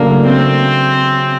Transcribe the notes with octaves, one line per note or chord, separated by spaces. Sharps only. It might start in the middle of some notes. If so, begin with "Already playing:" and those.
Already playing: C#3 F#3 A3 A#3 D4
C4